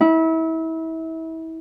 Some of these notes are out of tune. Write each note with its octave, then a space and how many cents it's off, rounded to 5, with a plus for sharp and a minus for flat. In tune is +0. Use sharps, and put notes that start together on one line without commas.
E4 -30